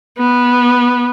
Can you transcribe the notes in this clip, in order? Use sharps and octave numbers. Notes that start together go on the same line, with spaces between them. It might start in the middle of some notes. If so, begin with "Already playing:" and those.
B3